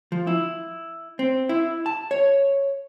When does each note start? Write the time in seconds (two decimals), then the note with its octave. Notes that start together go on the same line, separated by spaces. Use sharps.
0.12 F3
0.27 E4
1.19 C4
1.49 E4
1.86 A5
2.11 C#5